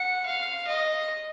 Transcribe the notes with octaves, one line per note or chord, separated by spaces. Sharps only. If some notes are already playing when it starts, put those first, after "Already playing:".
Already playing: F#5
F5
D#5